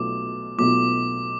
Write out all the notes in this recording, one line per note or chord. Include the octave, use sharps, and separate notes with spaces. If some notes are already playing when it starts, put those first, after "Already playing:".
Already playing: B1 B2 A3 F4 D6
B1 B2 A3 F4 D6